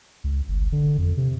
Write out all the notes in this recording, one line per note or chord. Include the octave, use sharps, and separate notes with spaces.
C#2
G1
D3
F2
C3